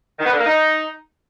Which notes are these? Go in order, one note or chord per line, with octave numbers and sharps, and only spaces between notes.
D#3
B3
D3
A#3
D#4